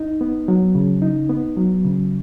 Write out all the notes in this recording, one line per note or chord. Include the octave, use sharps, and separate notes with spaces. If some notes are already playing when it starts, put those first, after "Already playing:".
Already playing: D#4
B3
F#3
C#3
D#4
B3
F#3
C#3